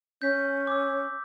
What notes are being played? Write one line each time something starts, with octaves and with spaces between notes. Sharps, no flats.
C#4 G6 B6
D6 E6